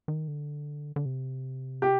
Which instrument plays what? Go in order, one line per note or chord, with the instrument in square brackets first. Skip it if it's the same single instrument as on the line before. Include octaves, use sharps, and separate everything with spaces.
[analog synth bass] D#3
D3
D3
C3
[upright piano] G4